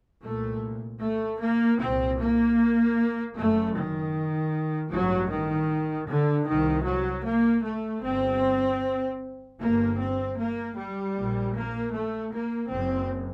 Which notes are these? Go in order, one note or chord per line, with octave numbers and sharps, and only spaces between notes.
C2 A#2 A3
A3
A#3
C2 A#2 C4
A#3
F#1 F#2 A3
D#3
A1 G2 F#3
D#3
D3
C2 C3 D#3
F#3
A#3
A3
G1 G2 C4
G1 G2 A#3
C4
A#3
G3
A#1 A#2
A#3
A3
A#3
F#1 F#2 C4